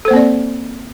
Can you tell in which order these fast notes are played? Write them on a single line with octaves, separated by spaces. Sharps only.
A4 C5 A#3 C4 D5